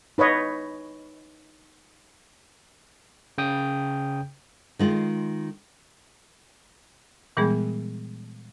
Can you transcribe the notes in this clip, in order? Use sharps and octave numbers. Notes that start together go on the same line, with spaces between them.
D#4 B4 C#5 D#5
C#3 G5 D#6
D#3 G#3 F4
A#2 E3 G3 G#3 B3 G#4